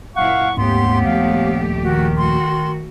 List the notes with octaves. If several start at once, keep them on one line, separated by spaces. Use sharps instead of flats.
F#2 A#2 E4 F5 F#5 C#6
D#2 G#2 A3 B3 C#4 G4 C6
D#1 F3 A#3 F5
D#3 F#4
A3 F#4 C6